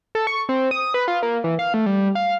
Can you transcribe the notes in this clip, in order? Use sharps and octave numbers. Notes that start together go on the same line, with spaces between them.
A4
C#6
C4
D#6
B4
F4
A#3
E3
F5
A3
G3
F5